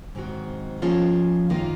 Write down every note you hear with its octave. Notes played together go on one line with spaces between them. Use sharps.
G#2 D#3 F#3 C4 F#4
F3 A#3 C#4 F4 G#4
F#2 D#3 A#3 F4